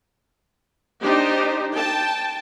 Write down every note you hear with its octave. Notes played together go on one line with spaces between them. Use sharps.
D4 D#4 G4 C5
G5 A5